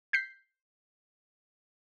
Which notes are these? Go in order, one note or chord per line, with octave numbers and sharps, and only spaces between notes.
G6 B6 C7